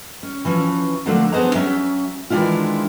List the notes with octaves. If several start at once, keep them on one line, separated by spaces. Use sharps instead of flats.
C#4
E3 F3 C#4
D3 F3 F#3 A3 A#3 D4
B3 D4 G#4 C5 D#5 A#5
F#3 C#4 E5
D#3 E3 G#3 D4 E4 F4